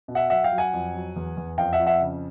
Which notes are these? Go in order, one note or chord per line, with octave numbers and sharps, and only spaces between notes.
B2
E5 F#5
F#3 E5 F#5
F5 G5
F#3
F#5 G#5
F2
F#3
E2
E2
F2 F5 G5
E5 F#5
F2
E5 F#5
C#3